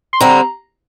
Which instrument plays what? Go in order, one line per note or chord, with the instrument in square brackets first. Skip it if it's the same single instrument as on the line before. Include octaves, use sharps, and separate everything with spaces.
[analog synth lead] C6
[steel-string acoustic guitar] D3 G3 C4 [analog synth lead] A#5